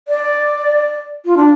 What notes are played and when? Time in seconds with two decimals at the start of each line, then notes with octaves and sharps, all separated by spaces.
0.08 D5
1.26 F4
1.37 D4